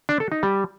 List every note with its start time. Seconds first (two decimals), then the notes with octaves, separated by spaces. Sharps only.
0.09 D4
0.20 A4
0.32 D#4
0.43 G3